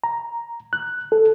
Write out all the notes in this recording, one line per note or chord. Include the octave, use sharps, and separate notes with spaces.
A#5
F#6
A4